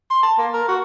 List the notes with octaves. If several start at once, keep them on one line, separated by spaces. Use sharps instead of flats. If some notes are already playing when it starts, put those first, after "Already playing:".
C6
A5
A#3
A#4
F#4